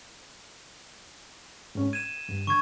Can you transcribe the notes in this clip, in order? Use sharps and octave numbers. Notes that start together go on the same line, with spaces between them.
G#2 C#4
G#6 D#7 E7
G2
D3 C#6 G#6